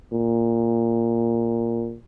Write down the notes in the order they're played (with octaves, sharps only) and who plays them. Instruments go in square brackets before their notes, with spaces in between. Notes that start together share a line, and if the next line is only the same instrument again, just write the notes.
[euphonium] A#2